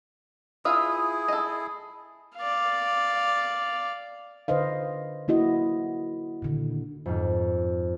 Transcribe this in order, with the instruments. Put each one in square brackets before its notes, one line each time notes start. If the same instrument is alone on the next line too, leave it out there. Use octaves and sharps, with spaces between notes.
[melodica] E4 G#4 [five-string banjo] F4 B4 E5 [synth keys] D#6
[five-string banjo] A4 D#5
[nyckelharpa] D5 F5
[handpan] D3 B4 C5 D#5 F5
A#3 E4 F#4 D#5
A#2 D3 D#3
[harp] F2 G#2